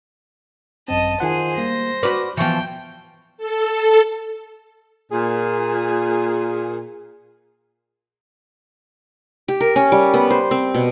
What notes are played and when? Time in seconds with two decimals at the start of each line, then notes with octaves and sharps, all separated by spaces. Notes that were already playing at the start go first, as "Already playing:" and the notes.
0.88 G#1 F#2 C4 D#5 A5
1.20 D#3 F4 G#4 C5 F#5
1.58 G3 A#3 A#6
2.03 F#4 B4 D5 D6 F6
2.37 E3 F3 B3 G5 C#6 C#7
3.37 A4
5.12 A#2 G#4
9.48 G4
9.60 A#4
9.76 C#4
9.92 G3
10.14 B3
10.30 C5
10.51 C4
10.74 B2